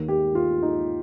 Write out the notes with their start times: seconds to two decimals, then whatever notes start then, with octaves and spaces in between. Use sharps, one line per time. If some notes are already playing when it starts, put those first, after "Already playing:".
Already playing: D#2 D#3
0.08 G4
0.35 F4
0.62 D#4